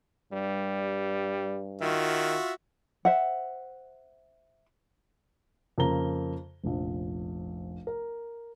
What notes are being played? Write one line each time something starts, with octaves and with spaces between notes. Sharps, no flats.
G2 G3
D#3 F4 F#4 E5
C5 E5 F#5
F2 C#3 A#3 A#4 A#5 G7
F1 A#1
A#4